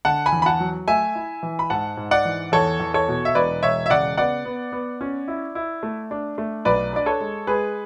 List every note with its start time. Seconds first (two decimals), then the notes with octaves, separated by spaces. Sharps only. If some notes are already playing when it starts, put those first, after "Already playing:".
0.05 D3 F#5 A5
0.26 G#5 B5
0.32 E2
0.42 B5
0.46 F#5 A5
0.60 F#3
0.88 A3 E5 G#5
1.15 E4
1.43 E3
1.59 B5
1.70 G#2 F#5 A5
1.97 G#2
2.11 D5 F#5
2.25 E3
2.52 E2 A4 C#5
2.80 E2
2.94 A4 C#5
3.08 B2
3.25 E5
3.35 E1 B4 D5
3.63 E1 C#5 E5
3.86 E5
3.90 C#3 D5 F#5
4.17 B3 D5 F#5
4.45 B3
4.72 B3
5.01 C#4
5.28 E4
5.55 E4
5.83 A3
6.11 D4
6.38 A3
6.65 B1 B4 D5
6.93 D4 D5
7.06 A4 C#5
7.20 G#3
7.47 G#3 G#4 B4